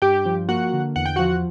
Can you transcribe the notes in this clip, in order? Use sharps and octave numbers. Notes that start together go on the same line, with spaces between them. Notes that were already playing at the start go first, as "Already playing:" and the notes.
G2 G4 G5
F3
A#3 F#4 F#5
D3
E2 F#5
G5
F3 F#4 F#5